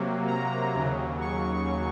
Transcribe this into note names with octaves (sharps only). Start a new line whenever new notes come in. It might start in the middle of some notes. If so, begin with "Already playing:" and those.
Already playing: C3 F#3 A#3
A#5
D#2 C#3 F#3
C#6